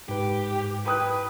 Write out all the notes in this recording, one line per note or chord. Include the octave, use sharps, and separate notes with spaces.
G#2 G4 B4
B4 G5 D#6 F#6